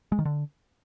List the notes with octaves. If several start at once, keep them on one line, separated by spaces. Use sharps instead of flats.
G#3
D#3
D3